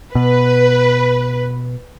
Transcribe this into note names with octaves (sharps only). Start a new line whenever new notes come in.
B2 B4